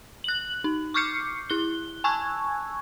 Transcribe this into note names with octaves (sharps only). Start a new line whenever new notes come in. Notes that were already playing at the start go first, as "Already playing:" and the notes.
F#6 F#7
D#4
C#6 D6 F6 G6 C7 C#7
E4 F#6 G7
G#5 A5 C#6 E6 F#6 G#6